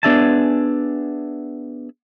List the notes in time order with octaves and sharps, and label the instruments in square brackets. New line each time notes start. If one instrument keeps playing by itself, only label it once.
[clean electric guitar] B3 D4 G#4 E5 G#5 A5